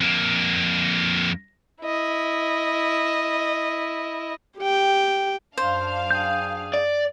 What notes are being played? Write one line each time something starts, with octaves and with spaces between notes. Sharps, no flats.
F2 A#3
E4 D#5
G4 G5
F#2 D4 C5 F5
G#4 G5 G6
D5